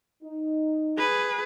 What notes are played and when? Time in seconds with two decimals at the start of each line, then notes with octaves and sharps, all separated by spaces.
0.23 D#4
0.99 G#4 B4